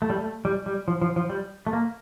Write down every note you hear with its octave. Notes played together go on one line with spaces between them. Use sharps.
A3
G3
A3
G3
G3
F3
F3
F3
G3
A3
A#3